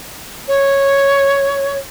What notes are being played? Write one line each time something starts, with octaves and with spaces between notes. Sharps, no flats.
C#5